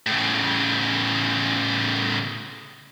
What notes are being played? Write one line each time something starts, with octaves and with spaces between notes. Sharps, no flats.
A2 C#3